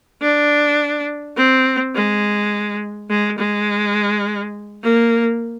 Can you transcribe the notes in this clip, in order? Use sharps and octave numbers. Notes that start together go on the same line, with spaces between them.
D4
C4
G#3
G#3
G#3
A#3